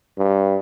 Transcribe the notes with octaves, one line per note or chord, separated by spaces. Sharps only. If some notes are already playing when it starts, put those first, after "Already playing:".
G2